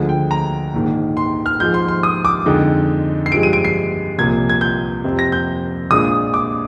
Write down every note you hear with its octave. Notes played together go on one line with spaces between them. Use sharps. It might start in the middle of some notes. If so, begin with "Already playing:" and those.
Already playing: D2 D3 F3 G#3
G5
A#5
A#1 G#2 D#3
C6
F6
G#2 F3 G#3 G6
C6
C6
D#6
D6
F2 D3 G#3 D#4
C7
G2 F3 G#3 D7
D#7
D7
C7
C2 A#2 F3 G#6
G#6
G6
F2 C3 F3 C4
A#6
G6
A#1 A#2 G#3 D4 F4 D#6
D6